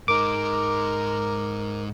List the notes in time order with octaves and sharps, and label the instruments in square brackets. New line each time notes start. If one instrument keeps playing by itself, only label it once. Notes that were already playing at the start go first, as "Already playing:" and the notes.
[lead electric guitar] G#2 D#4 [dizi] A#4 [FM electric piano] D6